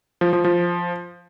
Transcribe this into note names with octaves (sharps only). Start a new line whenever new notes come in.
F3
F3
F3